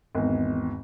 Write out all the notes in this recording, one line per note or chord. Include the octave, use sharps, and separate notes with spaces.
G#1 E2